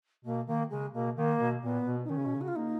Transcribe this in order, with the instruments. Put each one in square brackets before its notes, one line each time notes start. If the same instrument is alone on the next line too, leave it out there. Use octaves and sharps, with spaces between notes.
[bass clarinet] B2 [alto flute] A#3
[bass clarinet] D#3 [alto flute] A#3
[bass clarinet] C#3 [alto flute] G#3
[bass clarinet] B2 [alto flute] A#3
[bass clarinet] D#3 [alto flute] A#3
[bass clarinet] B2
[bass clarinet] A#2 [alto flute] B3
[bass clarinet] B2
[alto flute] D#4
[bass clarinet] D#3 [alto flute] C#4
[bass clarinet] C#3
B2
C#3
[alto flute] F#4
F4
[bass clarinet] A#3 [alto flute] D#4